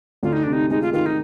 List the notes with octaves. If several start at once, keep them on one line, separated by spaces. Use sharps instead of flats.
D2 F4
D#4
C3 D4
D#4
G#3 D#4
F4
D#3 F4
D#4